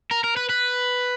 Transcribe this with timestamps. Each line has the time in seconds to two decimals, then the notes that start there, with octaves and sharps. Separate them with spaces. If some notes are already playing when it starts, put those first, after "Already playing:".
0.11 A#4
0.24 A#4
0.37 B4
0.49 B4